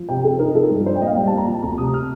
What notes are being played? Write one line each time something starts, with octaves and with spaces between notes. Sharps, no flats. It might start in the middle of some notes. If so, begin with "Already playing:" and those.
Already playing: F3
C3 G5
C4 A4
D#4 A#4
F3 A4
G2
D4 C5
G5
A#2 D#5
F5
G3 G5
A5
A#2 A#5
F3
A5
D2 A#5
C3 D#6
F6